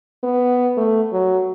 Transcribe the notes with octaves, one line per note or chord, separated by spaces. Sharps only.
B3
A3
F#3